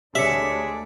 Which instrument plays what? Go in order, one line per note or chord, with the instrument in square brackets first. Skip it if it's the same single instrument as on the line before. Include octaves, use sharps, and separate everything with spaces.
[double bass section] D2 [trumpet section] G#3 G#4 D5 [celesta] G4 C#5 C#7 [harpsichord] E5